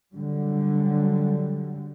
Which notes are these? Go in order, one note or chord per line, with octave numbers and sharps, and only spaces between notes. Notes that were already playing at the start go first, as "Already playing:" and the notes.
D3 F#3 G3